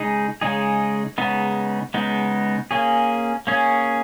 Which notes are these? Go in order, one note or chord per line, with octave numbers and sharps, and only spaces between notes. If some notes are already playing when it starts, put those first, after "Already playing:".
Already playing: C#3 G#3 D#4 G#4
C#3 G#3 D#4 G#4
C#3 G#3 B3 D#4
C#3 G#3 B3 D#4
A#3 C#4 G#4
A#3 C#4 G#4